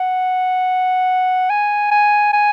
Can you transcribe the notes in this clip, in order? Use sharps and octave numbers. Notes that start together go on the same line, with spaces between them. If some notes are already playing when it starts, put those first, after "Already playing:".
Already playing: F#5
G#5
G#5
G#5